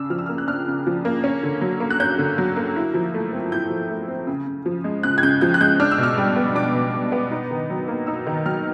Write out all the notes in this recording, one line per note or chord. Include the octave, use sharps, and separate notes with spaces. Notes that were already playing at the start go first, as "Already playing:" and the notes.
Already playing: C#3 D4 E6
F3 F6
E6
A#3 F6
F#6
D4 F6
C#3
F3
A#3
C#4
D3
F#3
A#3
F#6
C#4 G6
D3
F#3
A#3
E4
F3
A3
C4
E4 G6
F3
A3
C4
C#3
C#3
F3
G#3
C#3 F#6
G#6
C#3 G6
F3 G6
F#6
G#3 G6
D4 F6
E6
B2
F6
G3
B3
D4 D6
B2
G3
B3
D#4
D#3
F#3
A#3
D#4 E6
D#3
F#3 F6